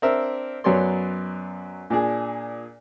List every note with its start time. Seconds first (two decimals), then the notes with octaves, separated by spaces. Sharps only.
0.02 C4 D4 A#4 E5
0.64 F#2 F#3 B3 C#5 D5 C6
1.90 A#2 D4 G#4